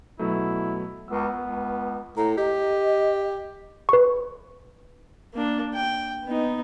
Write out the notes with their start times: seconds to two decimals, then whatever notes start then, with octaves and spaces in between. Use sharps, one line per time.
0.19 B2 F#3 A3 E4
1.08 C#2 B3 A#4 E6
1.39 C#2
2.17 A2 A#5
2.37 G4 D#5
3.89 B4 C#6
5.34 A#3 D4
5.74 G5
6.25 B3 D#4